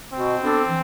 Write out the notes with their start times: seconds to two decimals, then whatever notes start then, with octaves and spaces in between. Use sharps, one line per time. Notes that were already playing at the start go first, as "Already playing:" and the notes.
0.13 B2 C4
0.40 B3 D4 A4
0.68 E3